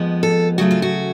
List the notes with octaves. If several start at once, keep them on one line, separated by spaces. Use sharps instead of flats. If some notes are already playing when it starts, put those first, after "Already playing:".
Already playing: F2 F3 G#3 B3
A4
C#3 F#3 A3 F4 F#4
F4
F#4